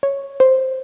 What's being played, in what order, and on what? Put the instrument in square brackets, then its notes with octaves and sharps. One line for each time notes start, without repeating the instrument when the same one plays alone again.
[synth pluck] C#5
C5